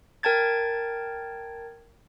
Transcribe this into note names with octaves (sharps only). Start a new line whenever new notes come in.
A#4 G5 A5 G#6 A6